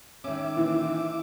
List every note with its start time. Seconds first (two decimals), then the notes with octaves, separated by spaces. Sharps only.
0.24 D#3 C#4 E5 D6
0.57 A#2 E3 E4